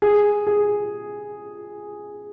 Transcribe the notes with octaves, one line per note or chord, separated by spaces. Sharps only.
G#4
G#4